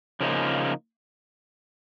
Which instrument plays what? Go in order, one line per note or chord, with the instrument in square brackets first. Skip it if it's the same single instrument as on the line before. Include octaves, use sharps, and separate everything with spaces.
[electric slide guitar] C#3 F3 A#3 D#4